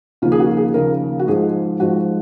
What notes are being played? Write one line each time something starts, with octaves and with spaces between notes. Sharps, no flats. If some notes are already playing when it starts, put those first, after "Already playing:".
D#2 C#3 F3 A#3 F4
G#4
F#4
G#4
D#2 C#3 F3 A#3 A#4
F#4
G#2 F3 G#3 G#4
G#2 F3 G#3 F#4